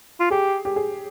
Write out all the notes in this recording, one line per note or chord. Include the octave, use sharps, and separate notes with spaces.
F4
G4 G#4
G4
G#4